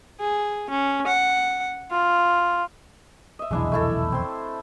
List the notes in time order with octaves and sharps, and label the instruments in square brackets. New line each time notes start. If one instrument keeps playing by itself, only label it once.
[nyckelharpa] G#4
C#4
F#5
F4
[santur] D#5 E5
[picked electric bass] F1 B1 E2 [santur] G#3 D4 E4
[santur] A3 E4 A4
C4 C6